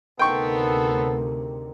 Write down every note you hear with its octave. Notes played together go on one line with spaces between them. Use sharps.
D2 C3 D#3 B3 C4 A4 G5 C#6